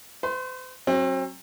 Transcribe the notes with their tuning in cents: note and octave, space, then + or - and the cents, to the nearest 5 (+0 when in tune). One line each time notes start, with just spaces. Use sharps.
C5 -45 C6 +25
F#3 +0 C4 +35